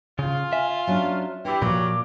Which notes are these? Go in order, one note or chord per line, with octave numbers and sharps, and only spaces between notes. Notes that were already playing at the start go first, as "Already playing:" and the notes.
C#3 F4
E5 G#5
F#3 C#4 D4 C#5
E3 D4 E4 G4 G5
A#2 F3 F#3 D6